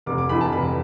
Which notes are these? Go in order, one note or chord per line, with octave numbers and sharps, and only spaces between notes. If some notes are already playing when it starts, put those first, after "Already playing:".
F1 D6
D6
F2 E3 B5
A5
F1 B5